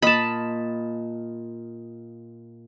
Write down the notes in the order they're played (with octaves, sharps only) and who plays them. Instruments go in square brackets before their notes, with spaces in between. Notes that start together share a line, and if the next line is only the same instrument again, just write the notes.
[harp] A#2 D#5 [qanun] A5 B5